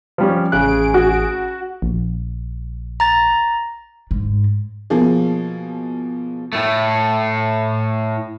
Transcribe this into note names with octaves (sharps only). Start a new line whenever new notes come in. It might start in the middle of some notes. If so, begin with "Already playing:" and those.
F3 G3 C#4
A1 C#3 G#4 F#6 D7
F#4
A#1
A#5 A6
G#2
B2 F3 A#3 G#4
A2 A3